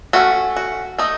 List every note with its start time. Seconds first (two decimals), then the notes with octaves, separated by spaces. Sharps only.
0.13 A3 C#4 F#4
0.56 F#4
0.98 A3 D#4